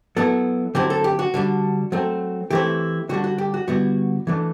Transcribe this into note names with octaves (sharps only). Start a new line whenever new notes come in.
F#3 B3 E4 A4
D3 F#3 C4 E4 G4
A4
G4
F#4
D3 G3 D4
F#3 A3 C4
E3 A3 C4 E4 G4
D3 G3 D4 F#4
F#4
G4
F#4
D3 G3 B3 E4 F#4
E3 A3 D4